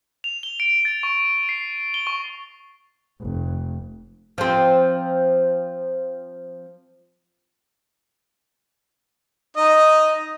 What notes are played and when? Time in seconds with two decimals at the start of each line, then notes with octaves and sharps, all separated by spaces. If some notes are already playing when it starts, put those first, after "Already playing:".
0.24 F7
0.43 G7
0.60 D7
0.85 A6
1.03 C#6
1.49 C7
1.94 G7
2.07 C#6
3.21 F1
4.38 F3 C4
9.57 D#4 D#5